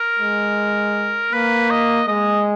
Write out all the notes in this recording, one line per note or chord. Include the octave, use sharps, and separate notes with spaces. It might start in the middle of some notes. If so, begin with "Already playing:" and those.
Already playing: A#4
G#3
A#3 B4
D#5
G#3 D#5